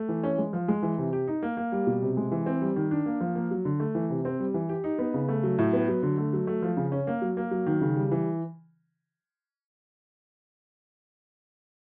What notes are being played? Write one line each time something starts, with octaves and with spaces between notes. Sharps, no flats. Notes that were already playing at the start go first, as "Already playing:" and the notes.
Already playing: A3
E3
C#4
G#3
F3
G#3
E3
C3
G4
D#4
A#3
A#3
G3
B2
C3
G#3
E3
C4
G3
D#3
D4
A#3
F3
A#3
F#3
D3
A3
E3
C3
C4
G3
E3
G4
D#4
B3
C#3
A3
F#3
A2
B3
F#3
D3
A3
F#3
A3
F3
C#3
C#4
A#3
F#3
A#3
F#3
D#3
C#3
G3
E3